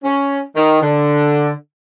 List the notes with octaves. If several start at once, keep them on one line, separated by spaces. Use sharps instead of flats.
C#4
D#3
D3